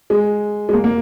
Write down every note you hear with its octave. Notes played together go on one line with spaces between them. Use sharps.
G#3
G#3
A#3
A#3